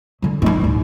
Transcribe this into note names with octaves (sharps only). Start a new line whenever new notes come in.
D3 F#3
G2 D#4
A1 D2